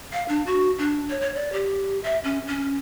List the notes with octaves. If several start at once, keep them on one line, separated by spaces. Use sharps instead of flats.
F5
D4
F#4
D4
C#5
C#5
D5
G4
E5
C#4
C#4